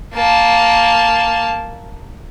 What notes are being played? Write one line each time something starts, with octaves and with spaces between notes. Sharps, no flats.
A#3 A5